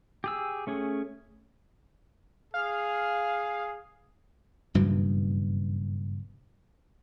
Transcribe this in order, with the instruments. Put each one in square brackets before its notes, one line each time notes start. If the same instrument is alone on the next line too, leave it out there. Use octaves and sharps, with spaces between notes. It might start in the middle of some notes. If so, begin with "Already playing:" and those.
[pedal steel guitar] G4 G#4 E6
A3 C#4 G#4
[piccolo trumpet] G#4 [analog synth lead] F5
[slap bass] F#1 G2 B2 E3